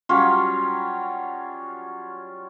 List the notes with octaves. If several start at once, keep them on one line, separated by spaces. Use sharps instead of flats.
F#3 G3 C#4 F4